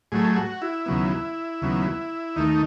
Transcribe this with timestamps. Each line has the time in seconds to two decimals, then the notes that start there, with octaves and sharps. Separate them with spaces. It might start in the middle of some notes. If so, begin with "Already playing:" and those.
0.12 A2 F#3 A3 G#4
0.36 F#4
0.62 E4
0.86 D#2 C#3 F#3 B3
1.62 D#2 C#3 F#3 B3
2.36 D#2 D#3 A3 D#4